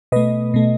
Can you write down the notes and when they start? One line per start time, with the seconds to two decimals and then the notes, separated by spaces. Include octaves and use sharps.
0.12 B2 A3 B4 D#5
0.54 B2 A3